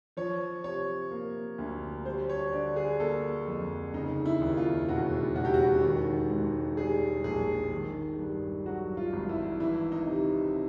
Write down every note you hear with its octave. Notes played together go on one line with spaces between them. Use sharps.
F3 C#5
C3 C#5
A#3
D2
G3 C5
C#5
D3 D5
G#4
A#3 A4
F2
C#3 D#4
E4
D#2
F4
E1 F#4
E1 F#4
G4
F#4
D#3
G#2
G3 G#4
A#1 G#4
D#3
G2
F#3 F#4
F4
G#1
E4
E3 E4
D#4
C3